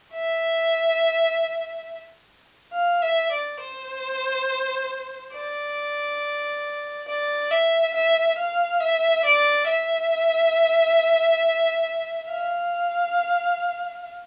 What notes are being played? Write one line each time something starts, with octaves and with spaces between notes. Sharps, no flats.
E5
F5
E5
D5
C5
D5
D5
E5
E5
F5
E5
D5
E5
F5